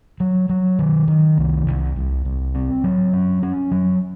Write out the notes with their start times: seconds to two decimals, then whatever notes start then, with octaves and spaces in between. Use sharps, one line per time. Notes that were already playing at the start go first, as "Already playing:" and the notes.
0.20 F#3
0.49 F#3
0.79 D#3
1.08 D#3
1.37 C2
1.67 C2
1.96 C2
2.25 C2
2.55 C4
2.84 F#3
3.13 C#4
3.43 C#4
3.71 F#3